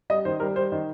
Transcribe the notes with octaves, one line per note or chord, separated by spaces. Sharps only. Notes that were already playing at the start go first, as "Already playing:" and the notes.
G3 D#5
D#3 C5
G3 A#4
G3 C5
D#3